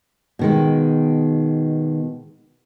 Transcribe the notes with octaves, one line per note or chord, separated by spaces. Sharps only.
B2 D#3 G#3